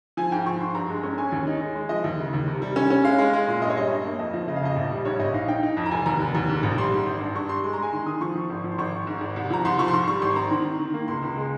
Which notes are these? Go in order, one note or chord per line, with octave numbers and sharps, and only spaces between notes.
F3 G#5
G#2 G5
F3 C#6
G#2 C6
G2 A#5
G#3
C#4 C#6
C#4 G#5
D#2 C#5
D#4
G#3
G#3
F3 D#5
D#2
C#3
D#2
C3
G3
C#4
C#4
G#3 F5
G#3
G#3
A#2
G2 D#5
C#5
G3 D#5
G2
A#3
F2 D#5
F3
C#3 D#5
F5
F2 D#5
A#1
G3
G#2 C#5
A#1 D#5
D#4 F5
D#4 G5
D#4
F2
A#5
F1 G#5
D#2 A#5
F1
D#2
G#2
A#1
G3 C6
G#2
G#1
G2
G2 C#6
G3 C6
G#3 C6
A#5
G#3 G#5
D#3 C6
D#3 D#6
F3 C#6
F3
G#1
F3
C6
G#1 C#6
G#1
G#2
G#1
C2
F3 A#5
C2 C6
F3 C#6
C6
G#2 C#6
G3 C#6
G#1 C6
C4 A#5
D#3
D#3
D#3
A#3
C#2 C6
C#2
G#3